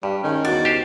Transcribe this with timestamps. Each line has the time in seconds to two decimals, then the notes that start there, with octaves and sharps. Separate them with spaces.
0.03 G2 G3
0.23 D#3 G#3 C#4
0.45 E2 F#4 D5
0.65 G4 C5